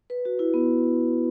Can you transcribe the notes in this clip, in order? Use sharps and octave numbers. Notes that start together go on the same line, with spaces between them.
B4
F#4
E4
B3